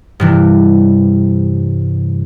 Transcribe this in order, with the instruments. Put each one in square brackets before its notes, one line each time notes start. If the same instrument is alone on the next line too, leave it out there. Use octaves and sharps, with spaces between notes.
[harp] G2 C3 E3